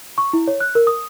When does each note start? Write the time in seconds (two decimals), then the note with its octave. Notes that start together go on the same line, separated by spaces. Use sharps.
0.18 C#6
0.33 E4
0.47 C#5
0.60 F#6
0.75 A#4
0.87 D#6